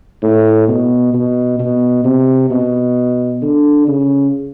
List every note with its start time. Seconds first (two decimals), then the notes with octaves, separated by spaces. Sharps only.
0.23 A2
0.68 B2
1.14 B2
1.59 B2
2.04 C3
2.51 B2
3.42 D3
3.88 C#3